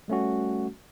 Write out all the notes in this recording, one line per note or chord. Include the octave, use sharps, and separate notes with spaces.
G3 A3 C#4 F#4